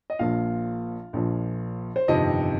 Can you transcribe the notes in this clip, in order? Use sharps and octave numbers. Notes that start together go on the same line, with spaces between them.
D#5
A#1 A#2 F3 F4 F5
A#1 A#2 F3
C5
G1 F2 C3 D#3 D#5